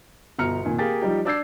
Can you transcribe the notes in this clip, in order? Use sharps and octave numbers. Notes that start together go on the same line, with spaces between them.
G1 B2 A#5 F6 C#7
F1 A#2 D#3 G#5
A#3 G4 G#4 F5 A#5 A6
F3 G3 D#4 G4
D4 D5 E6 G6 G#6 C7